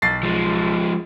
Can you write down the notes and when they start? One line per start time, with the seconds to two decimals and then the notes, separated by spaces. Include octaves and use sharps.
0.02 B1 A6 C7
0.23 F3 G#3